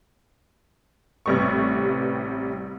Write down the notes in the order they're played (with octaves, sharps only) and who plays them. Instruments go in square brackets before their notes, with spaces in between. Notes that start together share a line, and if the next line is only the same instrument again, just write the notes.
[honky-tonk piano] A1 C3 G3 B3 C#6